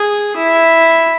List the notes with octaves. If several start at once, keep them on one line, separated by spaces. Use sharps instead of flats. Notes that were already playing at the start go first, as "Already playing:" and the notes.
Already playing: G#4
E4